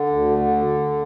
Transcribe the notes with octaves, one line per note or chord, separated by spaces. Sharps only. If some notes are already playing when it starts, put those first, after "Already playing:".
Already playing: D3
D2
D3